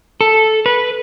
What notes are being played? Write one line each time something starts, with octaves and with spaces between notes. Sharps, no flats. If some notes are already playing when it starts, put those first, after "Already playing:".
A4
B4